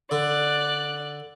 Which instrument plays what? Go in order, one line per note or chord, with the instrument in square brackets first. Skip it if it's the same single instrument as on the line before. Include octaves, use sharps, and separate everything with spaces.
[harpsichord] D3 [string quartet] D5 F#6